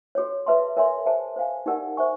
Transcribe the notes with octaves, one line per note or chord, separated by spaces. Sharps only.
F#4 A4 C#5
G#4 B4 E5 A5 C6
A#4 C#5 E5 G#5 C6
G#4 C5 E5 A5
C5 F5 G#5
D#4 G4 A#4 D5 F#5
C5 E5 G#5 C#6